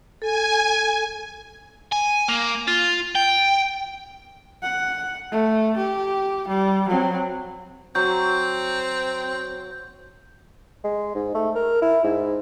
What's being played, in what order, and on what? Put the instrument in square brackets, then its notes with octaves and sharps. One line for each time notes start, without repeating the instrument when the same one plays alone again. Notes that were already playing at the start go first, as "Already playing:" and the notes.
[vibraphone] A4 [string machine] G#5
[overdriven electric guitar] G#5
A#3
F4
G5
[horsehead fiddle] F#5
A3
G4
G3
F#3 C4
[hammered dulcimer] F#3 [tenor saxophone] C4 [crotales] G6
[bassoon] G#3
G#2
A3
A#4
E4
G#2